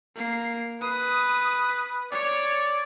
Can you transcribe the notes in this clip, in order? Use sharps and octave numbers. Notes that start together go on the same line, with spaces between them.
A#3 C7
B4 D#6
C#5 D5